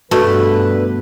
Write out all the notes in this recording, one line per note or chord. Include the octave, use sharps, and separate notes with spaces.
G2 B2 D3 A3 B4